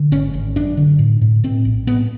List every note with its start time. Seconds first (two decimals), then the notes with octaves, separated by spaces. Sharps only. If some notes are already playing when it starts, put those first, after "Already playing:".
Already playing: D3
0.12 G#1 C#4
0.34 G#1
0.56 F#2 D4
0.77 D3
0.99 A2
1.21 A2
1.44 A2 C4
1.65 A#1
1.87 A2 B3